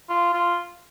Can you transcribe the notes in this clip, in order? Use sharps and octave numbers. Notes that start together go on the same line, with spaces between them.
F4
F4